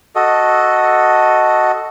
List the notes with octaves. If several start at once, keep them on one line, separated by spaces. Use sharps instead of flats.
F#4 A4 D#5